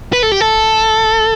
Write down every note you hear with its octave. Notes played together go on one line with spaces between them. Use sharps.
B4
A4
G4
A4